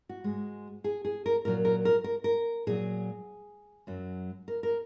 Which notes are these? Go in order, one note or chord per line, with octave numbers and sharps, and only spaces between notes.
F#4
G#2 G#3
G#4
G#4
A#4
A#2 F#3 A#4
A#4
A#4
A#4
A#4
A#2 F#3 G#4
F#2 F#3
A#4
A#4